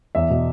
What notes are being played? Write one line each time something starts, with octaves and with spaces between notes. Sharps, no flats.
E2 E5
B2